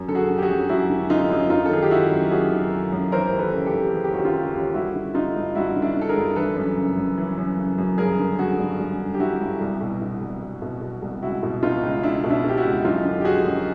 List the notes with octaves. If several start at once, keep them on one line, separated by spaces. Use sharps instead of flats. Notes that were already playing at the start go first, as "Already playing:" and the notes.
Already playing: F#2
D3 A4
F#4 G#4
D3
G4
F#4 G#4
F#2
F#2 E4 F#4
D3
D3 D#4 F4
F#2
F#2 D#4 F4
A4
D#3 G#4
G4
D#3 E4 F#4
F#2
F#2 F#4 G#4
D#3
D#3
F#2
E3 A#4 C5
D#2
A4 B4
C#3
G4 A4
D#2
E3 G#4
G4
D#2 F#4
F4 G4
C#3
D#2
G2 E4 F#4
D3
D3 D#4 F4
G2
G2 E4 F#4
D3
D4 E4
D3 A4
G#4 A#4
G2
E3 A4 B4
F#2
C#3
F#2
E3
F#2
C#3
F#2
G2 G#4 A#4
D3
D3 F#4 G#4
G2
G2
D3
G4
D3 E4 F#4
G2
C2
B2
B2
C2
C2
B2
B2
C2
C#2 E4 F#4
B2
B2 D#4 F4
C#2
C#2 D4 E4
B2
D4 E4
B2 G4
E4 F#4
C#2
F#2 D#4 F4
D3
G4
D3 F#4 G#4
F#2